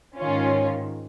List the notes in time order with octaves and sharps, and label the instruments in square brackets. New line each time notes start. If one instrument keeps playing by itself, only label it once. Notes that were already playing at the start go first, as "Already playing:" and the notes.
[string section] G#2 D#3 C#4 F4